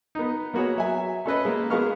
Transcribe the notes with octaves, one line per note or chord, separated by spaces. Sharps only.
B3 D#4
A#3 B3 F#4 G#4 C#5
F#3 E5 G#5
C#4 A4 B4 D#5
G#3 A#3
G#3 B3 F5 C#6 F6